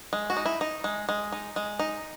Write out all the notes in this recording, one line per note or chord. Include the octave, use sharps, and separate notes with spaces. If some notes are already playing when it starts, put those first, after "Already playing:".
G#3
F#4
D#4
E4
D#4
G#3
G#3
D#4
G#3
D#4